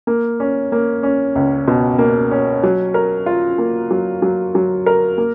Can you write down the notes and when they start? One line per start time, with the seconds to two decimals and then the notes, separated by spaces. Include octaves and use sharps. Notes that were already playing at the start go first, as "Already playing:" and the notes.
0.07 A#3
0.40 C#4
0.72 A#3
1.03 C#4
1.36 C#2
1.68 B2
1.99 A#3
2.31 C#4
2.64 F#3
2.94 A#4
3.26 F4
3.58 A#3
3.91 F#3
4.22 F#3
4.55 F#3
4.86 A#4
5.18 A#3